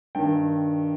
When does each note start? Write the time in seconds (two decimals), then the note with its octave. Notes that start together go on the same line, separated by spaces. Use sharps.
0.15 G2 D#3 G5